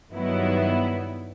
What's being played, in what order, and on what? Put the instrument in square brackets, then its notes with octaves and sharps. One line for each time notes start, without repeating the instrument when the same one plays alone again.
[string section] G2 D#3 F#3 B3 E4